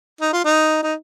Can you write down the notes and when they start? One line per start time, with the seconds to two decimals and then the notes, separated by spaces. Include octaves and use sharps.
0.21 D#4
0.33 F4
0.44 D#4
0.83 D#4